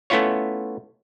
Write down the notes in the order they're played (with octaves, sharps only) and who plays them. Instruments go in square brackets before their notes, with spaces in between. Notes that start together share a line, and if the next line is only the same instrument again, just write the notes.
[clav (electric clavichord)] A3 B3 C#4 E4 F4 C#5